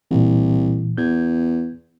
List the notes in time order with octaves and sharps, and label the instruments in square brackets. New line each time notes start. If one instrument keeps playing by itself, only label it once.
[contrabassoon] C2 [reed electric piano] A#2 E3
[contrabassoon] E2 [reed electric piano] G6 G#6